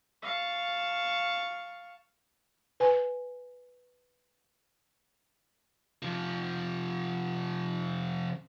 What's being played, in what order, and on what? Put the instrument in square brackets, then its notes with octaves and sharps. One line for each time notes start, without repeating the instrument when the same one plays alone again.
[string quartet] F5 A5 C#6
[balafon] B4 G#5
[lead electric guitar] C3 F3